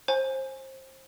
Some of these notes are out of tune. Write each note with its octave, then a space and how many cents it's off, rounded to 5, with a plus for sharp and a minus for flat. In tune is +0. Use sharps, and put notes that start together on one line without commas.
C5 +25 G#5 +0